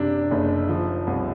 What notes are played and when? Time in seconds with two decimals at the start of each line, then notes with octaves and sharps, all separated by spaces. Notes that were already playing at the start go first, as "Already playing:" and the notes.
Already playing: F#1 C3 D4
0.31 F#1 D#4
0.69 F3
1.07 C2